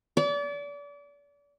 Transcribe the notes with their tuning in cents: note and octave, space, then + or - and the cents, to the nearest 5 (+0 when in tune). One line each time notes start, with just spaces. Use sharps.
D5 -35